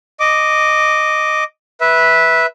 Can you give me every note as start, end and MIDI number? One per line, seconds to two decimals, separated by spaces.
0.20 1.44 75
0.20 1.44 86
1.81 2.46 71
1.81 2.46 76